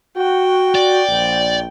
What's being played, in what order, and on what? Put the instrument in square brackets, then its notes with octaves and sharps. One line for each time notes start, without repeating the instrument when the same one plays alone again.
[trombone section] F#4 [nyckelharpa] G5
[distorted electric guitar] D5
[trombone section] A#1